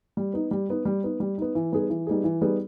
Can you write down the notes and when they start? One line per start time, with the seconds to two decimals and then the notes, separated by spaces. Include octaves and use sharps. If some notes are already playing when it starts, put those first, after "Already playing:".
0.17 G3
0.33 B3 D#4
0.51 G3
0.69 B3 D#4
0.85 G3
1.03 B3 D#4
1.20 G3
1.38 B3 D#4
1.55 E3
1.72 G3 B3 D#4 G#4
1.90 E3
2.07 G3 B3 D#4 G#4
2.24 E3
2.41 G3 B3 D#4 G#4